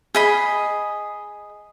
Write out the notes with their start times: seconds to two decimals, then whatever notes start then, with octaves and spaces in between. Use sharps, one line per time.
0.15 G#4 D#5 B5